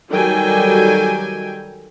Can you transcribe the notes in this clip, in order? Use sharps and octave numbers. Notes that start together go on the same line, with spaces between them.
D#3 F#3 G3 A4 G5 G#5